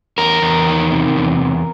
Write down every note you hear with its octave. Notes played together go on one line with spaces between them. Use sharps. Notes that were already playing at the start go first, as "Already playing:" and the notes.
E2 A#4
E2
D#3
C3
E2
E2